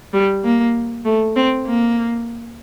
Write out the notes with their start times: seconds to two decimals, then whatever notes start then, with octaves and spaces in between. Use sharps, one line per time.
0.13 G3
0.44 A#3
1.05 A3
1.35 C4
1.66 A#3